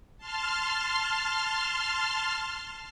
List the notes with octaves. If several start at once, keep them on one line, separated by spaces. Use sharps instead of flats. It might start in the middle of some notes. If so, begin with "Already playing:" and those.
A5 C6 F6